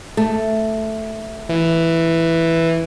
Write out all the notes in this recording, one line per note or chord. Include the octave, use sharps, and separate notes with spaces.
A3
E3